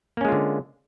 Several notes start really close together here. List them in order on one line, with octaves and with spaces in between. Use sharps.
A#3 C#4 G#3 F4 D3